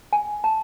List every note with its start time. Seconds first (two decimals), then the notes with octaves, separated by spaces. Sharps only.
0.13 G#5
0.44 A5